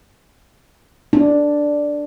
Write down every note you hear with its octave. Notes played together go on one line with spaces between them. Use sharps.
D4